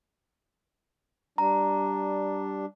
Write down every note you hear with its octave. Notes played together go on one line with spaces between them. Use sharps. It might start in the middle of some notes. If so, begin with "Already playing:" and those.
G3 D4 A#5